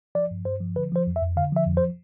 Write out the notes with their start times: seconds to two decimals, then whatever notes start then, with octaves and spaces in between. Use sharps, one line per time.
0.15 F3 D5
0.31 G2
0.45 G2 C5
0.60 F3
0.76 D3 B4
0.92 F3 C5
1.07 F2
1.16 E5
1.22 F2
1.37 D3 F5
1.52 F3 E5
1.67 F2
1.77 C5